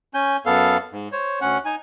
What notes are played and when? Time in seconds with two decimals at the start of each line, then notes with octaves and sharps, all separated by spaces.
0.14 C#4 G#5 G6
0.46 F#2 B3 A4 F5
0.92 G#2
1.12 C5 C#5
1.41 D2 C#4 F#5
1.65 D#4 G#5